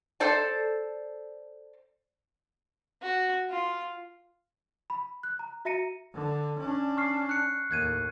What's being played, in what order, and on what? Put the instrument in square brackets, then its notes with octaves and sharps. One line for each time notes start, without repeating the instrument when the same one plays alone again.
[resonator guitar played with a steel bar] A4 C5 D5 A5
[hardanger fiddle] F#4
F4
[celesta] B5
F#6
A#5
F#4 E5 A#5 A#6 C#7 D#7
[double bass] D3
C#4 D4
[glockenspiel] C#6 F6 C7
F#6 C#7
[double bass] D#2 A2 [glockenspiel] F#6 G#6 D#7